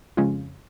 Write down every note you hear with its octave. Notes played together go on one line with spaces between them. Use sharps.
F2 C#3 G#3 C#4 F4